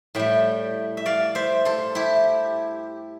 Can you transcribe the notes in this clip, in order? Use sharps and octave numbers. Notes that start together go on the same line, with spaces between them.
A2 G3 E5 G5
E5
D5 F5
C5 E5
A4 C5
E4 G4